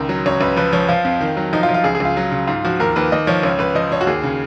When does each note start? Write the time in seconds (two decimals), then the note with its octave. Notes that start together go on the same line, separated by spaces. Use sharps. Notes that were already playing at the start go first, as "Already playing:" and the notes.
Already playing: C#2 D#3 A#4
0.09 F#3
0.26 C#2 C#5
0.41 C#2 B4
0.57 F3 B4
0.72 F3 C#5
0.89 F3 F4
1.05 F2
1.21 D#3
1.37 F#3
1.53 F3 D#4
1.63 F4
1.69 F3
1.74 F4
1.84 C#2 G#4
1.95 G#4
2.00 C#2 F4
2.17 F#3
2.32 C#3
2.47 G#2 F4
2.65 F3 F#4
2.80 D#2 A#4
2.96 D#2 B4
3.12 D#2 D#5
3.27 F3 C#5
3.43 C#2 C#5
3.59 C#2 B4
3.75 F3 D#5
3.91 F3 C#5
4.01 F#4
4.07 D#2 G#4
4.24 C#3